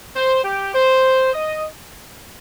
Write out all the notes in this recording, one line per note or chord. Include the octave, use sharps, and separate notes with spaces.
C5
G4
C5
D#5